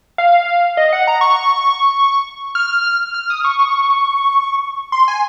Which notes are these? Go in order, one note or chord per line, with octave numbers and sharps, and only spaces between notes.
F5
D#5
F#5
A#5
C#6
F6
F6
D#6
C#6
C#6
C6
G#5